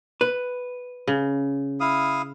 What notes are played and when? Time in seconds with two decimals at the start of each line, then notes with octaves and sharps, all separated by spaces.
0.21 B4
1.07 C#3
1.80 E4 F5 D#6